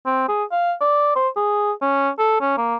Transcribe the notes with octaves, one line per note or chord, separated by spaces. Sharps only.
C4
G#4
F5
D5
C5
G#4
C#4
A4
C#4
A#3